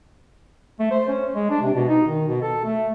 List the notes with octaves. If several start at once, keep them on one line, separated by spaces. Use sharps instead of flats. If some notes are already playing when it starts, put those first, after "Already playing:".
A3
C5
C#4
G#3
D4
C3
B2
D#4
D#3
B2
A4
A3